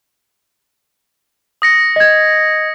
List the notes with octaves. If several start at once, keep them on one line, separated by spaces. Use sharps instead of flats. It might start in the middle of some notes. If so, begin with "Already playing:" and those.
D#6 A#6 C#7
D#5 G#6